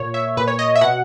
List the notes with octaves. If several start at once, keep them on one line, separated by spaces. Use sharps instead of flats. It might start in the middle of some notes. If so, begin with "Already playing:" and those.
Already playing: A#2 C#5
E5
A#2 B4
C#5
D#5
E5
B2 F#5